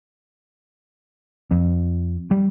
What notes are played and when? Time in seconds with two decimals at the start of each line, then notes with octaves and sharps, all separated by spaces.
1.51 F2
2.31 G3